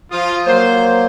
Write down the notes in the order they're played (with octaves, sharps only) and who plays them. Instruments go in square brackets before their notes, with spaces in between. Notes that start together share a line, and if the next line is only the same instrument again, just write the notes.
[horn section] F3 F4 [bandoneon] D#6
[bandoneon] F#3 A#3 [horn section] C5